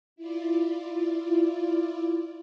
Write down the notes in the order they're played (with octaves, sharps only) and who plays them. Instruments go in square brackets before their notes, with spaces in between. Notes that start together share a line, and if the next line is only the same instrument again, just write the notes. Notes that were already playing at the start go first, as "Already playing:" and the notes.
[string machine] E4 F4 D5